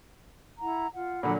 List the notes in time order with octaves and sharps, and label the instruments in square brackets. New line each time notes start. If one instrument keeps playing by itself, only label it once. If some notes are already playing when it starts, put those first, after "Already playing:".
[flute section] E4 F#5 A#5
F4 F#5
[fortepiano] A#2 D3 F#3 [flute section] F#5 B5